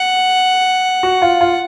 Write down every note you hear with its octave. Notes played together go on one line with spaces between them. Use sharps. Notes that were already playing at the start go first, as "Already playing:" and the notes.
Already playing: F#5
F#4
F4
F4